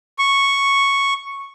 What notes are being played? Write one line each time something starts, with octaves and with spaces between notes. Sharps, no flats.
C#6